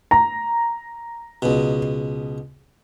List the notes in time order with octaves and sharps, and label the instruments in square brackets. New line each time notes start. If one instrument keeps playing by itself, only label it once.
[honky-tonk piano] A#5
[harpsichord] C#2 B2